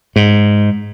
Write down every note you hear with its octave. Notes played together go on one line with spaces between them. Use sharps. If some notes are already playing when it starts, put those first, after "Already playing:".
G#2